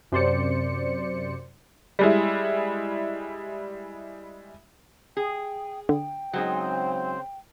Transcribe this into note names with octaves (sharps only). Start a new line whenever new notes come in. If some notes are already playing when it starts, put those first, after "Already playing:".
F#2 C3 C5 D5 C#7
G3 G#3 E4
G#4 G5
D3 G5
C#3 F#3 G#3 C4 D#4 C5